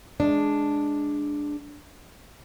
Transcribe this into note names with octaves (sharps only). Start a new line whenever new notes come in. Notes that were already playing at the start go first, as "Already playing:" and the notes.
G#3 D4